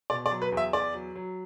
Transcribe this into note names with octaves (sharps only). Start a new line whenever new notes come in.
B2 D5
D5
F#3
B4
E2
E5
E2 D5
F#3
F#3